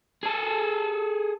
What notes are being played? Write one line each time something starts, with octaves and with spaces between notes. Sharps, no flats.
G#4 A4